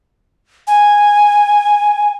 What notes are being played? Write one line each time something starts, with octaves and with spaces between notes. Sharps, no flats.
G#5